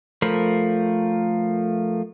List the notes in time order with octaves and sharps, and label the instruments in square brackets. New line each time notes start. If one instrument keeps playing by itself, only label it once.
[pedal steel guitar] F3 A3 A#4 C5 B5